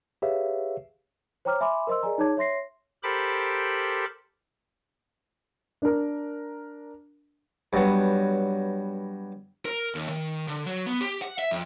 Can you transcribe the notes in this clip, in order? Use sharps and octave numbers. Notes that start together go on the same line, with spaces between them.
G4 G#4 B4 C#5 E5 F5
C5 C#5 G5 A#5 D6 F6
E5 G#5 B5 C6 D6
A#4 C5 D#5 C6 E6
G#4 A#4 D5 D#5 G#5 A#5
D#4 G#4 C#5 A5 D6 G#6
C#5 E5 C6 A#6 C7
G4 A4 A#4 C5 B5 D6
D4 A#4
G2 F#3 B3
A#4
D#2
D#3
D3
F#3
B3
G4
F#5
E5
F2